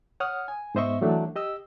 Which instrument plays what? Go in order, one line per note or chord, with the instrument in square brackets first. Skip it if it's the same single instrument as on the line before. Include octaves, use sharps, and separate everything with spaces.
[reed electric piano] C#5 F#5 D#6 F6
G#5
G#2 B3 C5 D#5 E5 C#6
E3 F#3 A3 D4
G4 D#5 E6